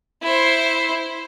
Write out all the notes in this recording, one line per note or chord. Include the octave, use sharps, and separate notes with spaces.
E4 C5